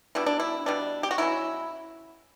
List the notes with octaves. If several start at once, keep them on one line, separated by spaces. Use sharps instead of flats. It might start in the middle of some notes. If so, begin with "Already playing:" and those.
B2 G3 D4 E4
D4
E4
B2 G3 D4
G4
F#4
B2 F#3 C#4 E4